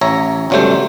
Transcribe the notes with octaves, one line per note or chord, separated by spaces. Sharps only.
A1 C#5 E5 A#5
G1 C#2 F#3 G3 A3 C5